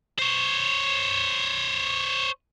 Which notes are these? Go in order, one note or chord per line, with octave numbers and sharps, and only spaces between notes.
C5 C#5